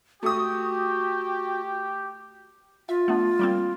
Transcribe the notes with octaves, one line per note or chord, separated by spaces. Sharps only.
A3 F#4 G4 D#6
F4 E5
A3 B3 D4
G3 A#3 C4